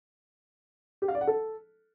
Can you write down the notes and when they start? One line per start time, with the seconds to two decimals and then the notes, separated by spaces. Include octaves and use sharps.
1.02 G4
1.08 F5
1.15 D5
1.21 F#5
1.27 A4